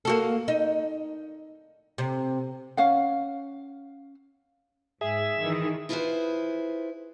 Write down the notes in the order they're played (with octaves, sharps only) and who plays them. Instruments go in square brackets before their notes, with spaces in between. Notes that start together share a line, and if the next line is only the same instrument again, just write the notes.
[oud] A#3 F#4 A4
D#4
C3
[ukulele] C#4 F5 F#5
[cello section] G#2 [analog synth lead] G#4 [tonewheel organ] E5
[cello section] D#3 E3
[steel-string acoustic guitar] E4 F4 G#4 A4 B4 C5